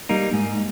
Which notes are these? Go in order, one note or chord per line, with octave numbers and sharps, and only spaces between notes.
G3 A#3 D#4
G#2